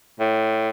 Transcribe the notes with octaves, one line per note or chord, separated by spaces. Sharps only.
A2